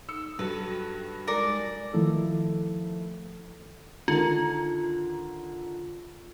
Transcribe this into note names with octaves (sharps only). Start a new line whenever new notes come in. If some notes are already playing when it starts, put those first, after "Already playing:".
D#4 E6 C#7
G2 F#3 F#4 A4 B4
G#3 D#4 A#4 D5
D#3 F3 A3 E4 A4
D3 D#3 F4 A#5